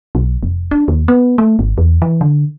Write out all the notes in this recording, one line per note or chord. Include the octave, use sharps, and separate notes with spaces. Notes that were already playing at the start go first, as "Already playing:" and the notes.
B1
F1
D4
D#2
B3
A3
G#1
E2
E3
D3